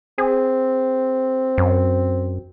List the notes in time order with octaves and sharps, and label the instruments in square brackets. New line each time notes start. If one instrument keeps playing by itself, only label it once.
[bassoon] C4 [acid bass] G#4
[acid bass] F#2